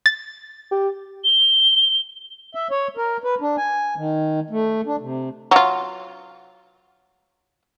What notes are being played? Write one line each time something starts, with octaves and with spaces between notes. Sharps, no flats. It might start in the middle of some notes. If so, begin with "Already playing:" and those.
A6
G4
G7
E5
C#5
A#4
B4
D4
G#5
D#3
A3
D4
C3
F#3 F4